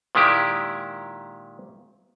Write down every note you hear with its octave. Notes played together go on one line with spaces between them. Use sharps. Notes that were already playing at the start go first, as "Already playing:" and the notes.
A#2 D#3 G#3 E4 G4